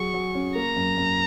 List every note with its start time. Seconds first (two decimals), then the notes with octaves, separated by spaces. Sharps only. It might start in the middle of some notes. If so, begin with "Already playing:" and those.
Already playing: F#3 G#4 C#6
0.14 F#3
0.35 C#4
0.55 A#3 A#5
0.76 F#2
0.98 F#2